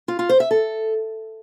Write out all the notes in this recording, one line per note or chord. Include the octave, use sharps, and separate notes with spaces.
F4
F4
C5
E5
A4